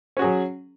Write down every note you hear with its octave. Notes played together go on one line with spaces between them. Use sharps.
F#3 C#4 F#4 G#4